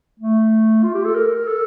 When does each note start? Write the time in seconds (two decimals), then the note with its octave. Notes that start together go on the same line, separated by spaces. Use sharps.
0.20 A3
0.84 F4
0.95 G4
1.05 A4
1.15 A#4
1.47 A4